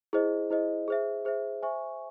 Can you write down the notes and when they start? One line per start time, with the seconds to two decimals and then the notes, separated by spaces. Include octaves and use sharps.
0.13 E4 G#4 C5 D#5
0.50 E4 G#4 C5 D#5
0.88 G#4 C5 E5
1.25 G#4 C5 E5
1.62 C5 E5 G#5 C#6